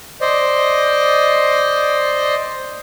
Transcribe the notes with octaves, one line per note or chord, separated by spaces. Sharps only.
C5 D5 D#5